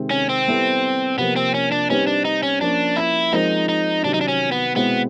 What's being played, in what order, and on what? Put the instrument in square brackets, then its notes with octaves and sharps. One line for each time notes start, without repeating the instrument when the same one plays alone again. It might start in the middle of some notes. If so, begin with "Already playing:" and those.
Already playing: [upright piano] C3 D#3 G#3 C4
[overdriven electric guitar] C#4
C4
[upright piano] G3 B3 E4 A4 C5
[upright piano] C3 F3 A#3 [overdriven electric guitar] B3
[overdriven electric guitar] C4
C#4
D4
[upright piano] G3 C4 D#4 G4 B4 [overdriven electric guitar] C#4
[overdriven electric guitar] D4
D#4
C#4
[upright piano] F3 A#3 C#4 [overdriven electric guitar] D4
[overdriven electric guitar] E4
[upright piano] F3 G#3 C4 F4 A#4 [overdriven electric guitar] D#4
[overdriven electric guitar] D#4
[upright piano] C3 D#3 F#3 [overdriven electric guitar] D4
[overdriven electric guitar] D#4
D4
C#4
B3
[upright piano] B2 G#3 C4 E4 [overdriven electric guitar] B3